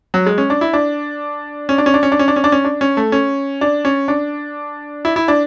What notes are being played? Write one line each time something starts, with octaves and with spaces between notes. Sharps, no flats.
F#3
G#3
C#4
D4
E4
D4
C#4
D4
C#4
D4
C#4
D4
C#4
D4
C#4
D4
C#4
D4
C#4
A3
C#4
D4
C#4
D4
E4
E4
D4